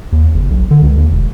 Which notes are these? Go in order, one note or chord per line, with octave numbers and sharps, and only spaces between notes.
D#2
F#1
B1
D3
C#2
D#2
E1